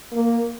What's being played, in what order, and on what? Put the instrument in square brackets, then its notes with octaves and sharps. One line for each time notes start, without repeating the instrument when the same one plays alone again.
[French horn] A#3